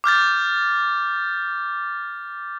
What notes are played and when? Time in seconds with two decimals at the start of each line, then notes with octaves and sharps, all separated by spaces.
0.04 D6 F6 G6 A6